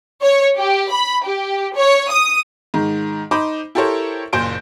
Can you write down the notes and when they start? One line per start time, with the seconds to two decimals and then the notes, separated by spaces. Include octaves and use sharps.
0.22 C#5
0.57 G4
0.90 B5
1.25 G4
1.76 C#5
2.10 D#6
2.74 G#2 D#3
3.31 D#4 C5 B5 D6
3.75 E4 G4 A4 A#4 C5 C#5
4.33 F#1 A#2 C5 G6 D7